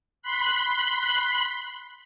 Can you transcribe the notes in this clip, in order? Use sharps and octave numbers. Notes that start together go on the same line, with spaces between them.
B5 C6 F#6